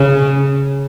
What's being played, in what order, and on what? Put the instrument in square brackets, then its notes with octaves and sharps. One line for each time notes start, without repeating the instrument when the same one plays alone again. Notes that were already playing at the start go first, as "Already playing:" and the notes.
Already playing: [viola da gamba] C#3